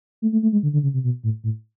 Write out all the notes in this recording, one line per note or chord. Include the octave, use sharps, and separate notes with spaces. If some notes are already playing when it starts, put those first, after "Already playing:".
A3
A3
A3
G#3
D3
D3
C#3
C3
B2
A2
A2